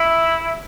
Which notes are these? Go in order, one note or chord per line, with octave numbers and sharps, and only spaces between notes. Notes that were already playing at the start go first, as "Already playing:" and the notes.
Already playing: E4